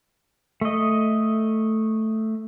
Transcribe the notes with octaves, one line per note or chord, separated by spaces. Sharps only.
A3 D#5